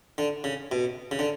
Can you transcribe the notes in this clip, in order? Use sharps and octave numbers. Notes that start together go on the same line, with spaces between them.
D3
C#3
B2
C#3
D3